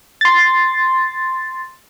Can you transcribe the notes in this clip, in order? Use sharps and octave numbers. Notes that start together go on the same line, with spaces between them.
C6 A6